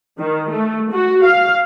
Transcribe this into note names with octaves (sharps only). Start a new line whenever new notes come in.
D#3
A3
F#4
F5